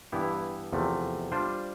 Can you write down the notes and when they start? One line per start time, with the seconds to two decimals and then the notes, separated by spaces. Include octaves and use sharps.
0.12 G2 E3 B3 E4 G4
0.73 E2 C3 F3 A3
1.32 G3 D4 F4 C5